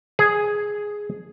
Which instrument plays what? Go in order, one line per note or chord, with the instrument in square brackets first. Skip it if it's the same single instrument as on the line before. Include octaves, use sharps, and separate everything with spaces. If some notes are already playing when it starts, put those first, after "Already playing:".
[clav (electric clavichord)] G#4